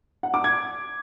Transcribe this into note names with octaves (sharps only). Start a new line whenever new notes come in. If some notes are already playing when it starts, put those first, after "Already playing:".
F#5
D6
G#6